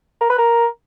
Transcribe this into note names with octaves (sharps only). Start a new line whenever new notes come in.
A#4
B4
A#4